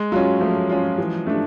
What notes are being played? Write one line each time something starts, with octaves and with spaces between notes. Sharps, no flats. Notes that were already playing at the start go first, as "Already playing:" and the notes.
Already playing: G#3
F#3 C#4 F4
F3 A3
C#4 F4
E3
A3 D4